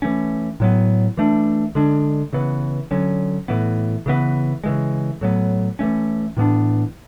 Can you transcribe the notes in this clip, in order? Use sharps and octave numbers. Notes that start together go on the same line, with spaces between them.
E3 A3 C#4
A2 F#3 B3
E3 A3 D4
D3 G#3 D4
C#3 E3 B3
D3 F#3 C#4
A2 E3 B3
C#3 E3 B3
C#3 E3 G#3
A2 F#3 B3
E3 A3 C#4
A2 E3 B3 D4